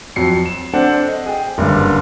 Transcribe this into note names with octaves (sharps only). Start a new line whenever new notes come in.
F2 F#3 C7 C#7
E7
C4 D4 A4 C5 F#5
D#5
G#4 G5
F#1 G2 D3